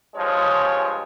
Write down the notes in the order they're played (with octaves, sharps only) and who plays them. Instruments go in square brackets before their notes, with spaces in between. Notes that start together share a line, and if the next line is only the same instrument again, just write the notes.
[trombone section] G2 F3 G#3 [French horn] C#5